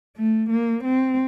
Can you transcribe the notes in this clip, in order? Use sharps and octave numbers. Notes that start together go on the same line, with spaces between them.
A3
A#3
C4